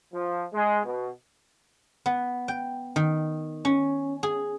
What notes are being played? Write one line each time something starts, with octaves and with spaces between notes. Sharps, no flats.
F3
G#3
B2
B3
G5
D#3
C#4
G#4